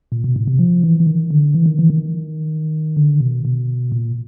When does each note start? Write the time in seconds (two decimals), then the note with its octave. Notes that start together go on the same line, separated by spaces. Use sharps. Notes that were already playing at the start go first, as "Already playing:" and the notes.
0.12 A#2
0.24 B2
0.36 A2
0.47 C3
0.59 F3
0.84 E3
1.00 E3
1.07 D#3
1.30 D3
1.54 E3
1.66 D#3
1.79 E3
1.90 D#3
2.97 D3
3.20 B2
3.45 B2
3.92 A#2